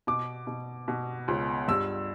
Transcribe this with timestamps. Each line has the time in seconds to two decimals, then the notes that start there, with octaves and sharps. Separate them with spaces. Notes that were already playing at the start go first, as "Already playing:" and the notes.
0.07 B2 D6
0.47 B2
0.88 B2
1.28 C#2
1.68 G2 E6